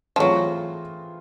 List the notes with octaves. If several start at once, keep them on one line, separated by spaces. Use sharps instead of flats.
F3
E3 F#3 A3 C4 F4 G#4